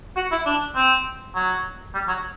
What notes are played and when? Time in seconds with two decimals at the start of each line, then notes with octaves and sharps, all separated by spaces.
0.16 F#4
0.32 E4
0.46 D4
0.76 C4
1.35 F#3
1.94 G3
2.08 F#3